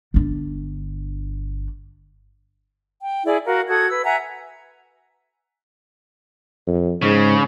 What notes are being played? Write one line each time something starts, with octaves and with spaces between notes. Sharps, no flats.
G1 D4
G5
E4 G#4 D5
F#4 A#4 F5
F#4 A4 D#6 G#6
B4 E6
E5 F#5 G#5 A#5
F2
G#2 C#3